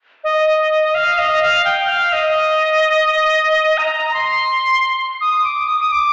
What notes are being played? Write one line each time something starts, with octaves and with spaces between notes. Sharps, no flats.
D#5
F5
D#5
F5
G5
F5
D#5
A#5
A#5
C6
D#6
D6
D#6
D#6
D6